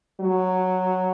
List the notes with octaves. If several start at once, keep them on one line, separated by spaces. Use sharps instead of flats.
F#3